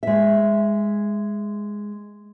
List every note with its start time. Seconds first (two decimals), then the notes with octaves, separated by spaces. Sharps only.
0.03 G#3 E5